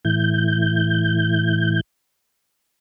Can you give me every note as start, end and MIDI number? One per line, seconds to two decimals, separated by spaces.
0.05 1.81 45
0.05 1.81 52
0.05 1.81 91